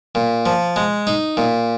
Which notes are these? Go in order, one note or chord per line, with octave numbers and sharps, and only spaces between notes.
A#2
F3
G#3
D#4
A#2